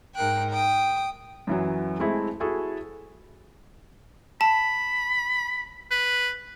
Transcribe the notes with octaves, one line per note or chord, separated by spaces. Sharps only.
G#2 D#4 A#4 G5 F#6
G5 D#6
F#2 E3 F#3
G#3 A3 C4 E4 G#4
E4 F#4 G#4 A4
A5 B5
B4